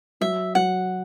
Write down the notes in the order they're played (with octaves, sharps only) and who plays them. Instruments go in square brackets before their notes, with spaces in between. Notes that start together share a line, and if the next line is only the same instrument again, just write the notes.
[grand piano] F#3 [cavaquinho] E5
[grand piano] F#3 [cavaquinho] F#5